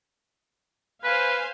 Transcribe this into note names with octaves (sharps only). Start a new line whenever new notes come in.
B4 C5 F5 G#5